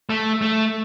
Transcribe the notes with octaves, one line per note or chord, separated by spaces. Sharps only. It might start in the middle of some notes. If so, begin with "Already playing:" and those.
A3
A3